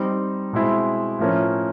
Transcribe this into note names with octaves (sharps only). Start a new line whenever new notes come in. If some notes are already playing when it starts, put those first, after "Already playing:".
Already playing: G3 C4 D#4
B2 G#3 C4 E4
A2 F3 A#3 C#4